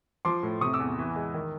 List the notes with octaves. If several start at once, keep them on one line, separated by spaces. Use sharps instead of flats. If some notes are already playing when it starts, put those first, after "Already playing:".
F3 C6 D6
A2
C3 C#6 D#6
D6 E6
E2
E3
G#3
D#3